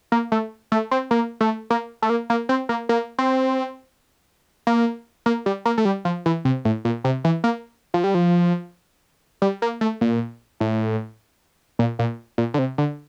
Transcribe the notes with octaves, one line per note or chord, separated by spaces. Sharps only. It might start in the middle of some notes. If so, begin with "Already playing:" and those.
A#3
A3
A3
C4
A#3
A3
A#3
A3
A#3
A#3
C4
A#3
A#3
C4
A#3
A#3
G3
A#3
A3
G3
F3
E3
C3
A2
A#2
C3
E3
A#3
F3
G3
F3
G3
A#3
A3
A#2
A2
A#2
A#2
A#2
D3
C3
D3